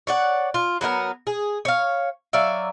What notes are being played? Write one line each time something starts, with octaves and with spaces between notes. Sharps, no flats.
C#5 D5 F#5
F4
F#3 B3 D#4 A#4
G#4
C#5 F5
F#3 D5 E5 F5